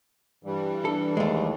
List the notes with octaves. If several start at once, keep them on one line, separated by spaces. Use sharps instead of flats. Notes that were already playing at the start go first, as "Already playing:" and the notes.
G2 E3 G3
D4 A4
D#2 G#3 A3